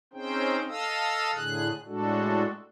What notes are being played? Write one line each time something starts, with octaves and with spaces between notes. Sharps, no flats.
C4 C#4 D#4 G#4 C5 G5
A4 D#5 F5 D#6 E6
A2 D3 G#4 F#6
A2 G#3 D4 F#4 A4